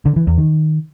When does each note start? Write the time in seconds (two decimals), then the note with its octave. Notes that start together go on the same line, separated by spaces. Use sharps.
0.06 D3
0.16 E3
0.27 E2
0.38 D#3